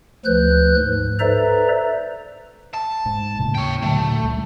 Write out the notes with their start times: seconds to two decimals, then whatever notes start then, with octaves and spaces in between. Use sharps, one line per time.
0.25 D2 F3 B4 F#6 G6
0.79 G#2
1.19 A4 B4 C5 D5 E5 A#5
2.74 A5
3.06 G#2
3.39 D#2 A2 C#3
3.55 C#5 G5
3.82 A#2 D3 F#3 A3
4.23 C#2 G3